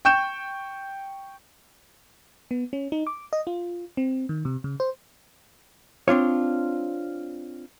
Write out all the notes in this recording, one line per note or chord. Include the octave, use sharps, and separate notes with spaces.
G5 C#6 G6 E7
B3
C#4
D#4
D6
D#5
F4
C4
D#3
C3
C#3
C5
C4 D4 F4 C#5